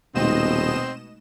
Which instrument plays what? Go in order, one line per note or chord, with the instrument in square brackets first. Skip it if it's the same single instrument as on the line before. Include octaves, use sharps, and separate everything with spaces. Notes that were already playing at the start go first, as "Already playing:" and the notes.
[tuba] D#1 [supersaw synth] B2 D#5 E7 [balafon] G#3 A3 D#4 [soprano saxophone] C4